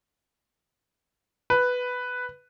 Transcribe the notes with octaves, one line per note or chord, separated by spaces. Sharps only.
B4